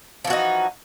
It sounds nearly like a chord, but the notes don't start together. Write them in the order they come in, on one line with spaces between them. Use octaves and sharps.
F3 E3 F#4 D#4